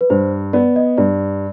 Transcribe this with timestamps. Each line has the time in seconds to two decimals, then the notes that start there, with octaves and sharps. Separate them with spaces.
0.01 B4
0.10 G2 C5
0.53 B3 D5
0.76 D#5
0.97 G2 D5